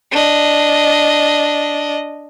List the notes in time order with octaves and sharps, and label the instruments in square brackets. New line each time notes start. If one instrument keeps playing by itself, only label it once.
[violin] D4 D#5